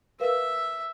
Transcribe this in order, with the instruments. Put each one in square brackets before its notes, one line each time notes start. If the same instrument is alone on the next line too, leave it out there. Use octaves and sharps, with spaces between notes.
[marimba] A#4 B4 F5 [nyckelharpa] E5